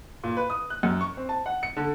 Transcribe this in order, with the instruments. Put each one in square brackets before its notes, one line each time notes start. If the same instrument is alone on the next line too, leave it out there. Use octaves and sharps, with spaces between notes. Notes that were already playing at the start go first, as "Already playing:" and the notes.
[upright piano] A#2
B4
D#6
F#6
F#2
C#6
C4
A5
F#5
C#7
D3